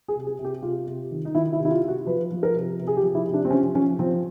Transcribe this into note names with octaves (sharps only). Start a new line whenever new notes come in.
G#4
C3
G#4
C3
G4
C3 F4
C3
D#3
D#4
D#3 E4
E4
C3
E4
F4
C3
F#4
F3 B4
F3
A#4
C3
C3
G#4
G4
F3
E4
C3
D4
C4
F3 C#4
F3 C#4
F3 C4